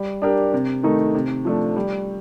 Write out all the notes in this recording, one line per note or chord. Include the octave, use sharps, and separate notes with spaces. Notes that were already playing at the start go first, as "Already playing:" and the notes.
Already playing: G3
D4 G4 A#4
C3
D#3 A3 D#4
C3
F3 A3 D4
G3